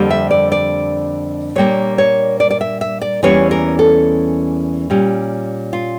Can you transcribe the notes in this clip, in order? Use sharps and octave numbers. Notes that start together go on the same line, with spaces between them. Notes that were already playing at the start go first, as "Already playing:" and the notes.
Already playing: F2 D3 G3 A#3
E5
D5
D5
A#2 G3 A#3 D4 C#5
C#5
D5
D5
E5
E5
D5
E2 E3 G3 A#3 C#4 C#5
A#4
A4
A#2 G3 C#4
F4